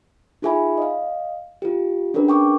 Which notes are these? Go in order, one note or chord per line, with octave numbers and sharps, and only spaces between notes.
D#4 F4 G#4 E5 G#5 B5
D#5 F5
F4 G4
C#4 D4 G#4 A#4 B4
G5 C#6 D6